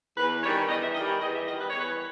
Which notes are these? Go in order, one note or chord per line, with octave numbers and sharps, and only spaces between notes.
E2 B4
D#3 G3 C#5
E2 D#5
E5
D#3 G3 D#5
C#5
E2 D#5
E5
D#3 G3 D#5
B4
E2 C#5
B4